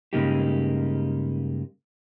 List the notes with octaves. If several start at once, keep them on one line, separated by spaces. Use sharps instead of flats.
G2 C#3 G#3 A#3 D#4 G4